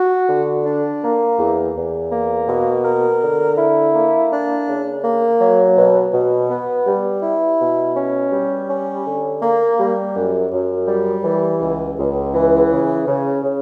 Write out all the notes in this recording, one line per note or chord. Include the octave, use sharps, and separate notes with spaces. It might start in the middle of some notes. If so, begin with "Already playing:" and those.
Already playing: F#4
D3
D4
A#3
E2
E2
A#3
B2
A#4
D3
E4
A#3
D4
C#3
A#3
F#3
B2
B2
B3
G3
E4
B2
C#4
G3
C#4
D3
A#3
G3
F#2
F#2
G3
E3
C#2
C#2
E3
C#3
C#3
C#3